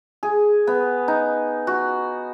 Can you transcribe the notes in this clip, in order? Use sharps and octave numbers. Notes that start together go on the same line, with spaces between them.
G#4
B3
D#4
F#4